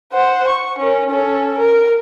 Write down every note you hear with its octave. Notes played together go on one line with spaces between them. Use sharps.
C5 F#5
C#6
C#4 A#4
C#4 A4
A#4